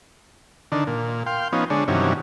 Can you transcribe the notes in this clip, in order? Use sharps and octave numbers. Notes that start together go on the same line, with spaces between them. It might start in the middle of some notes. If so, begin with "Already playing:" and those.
D3 D#3 D4
A#2
F5 G5 C6
F3 B3 C#4 D#4
D3 G#3 D4 C#5
G2 C3 D#3 E3 F#3 C#4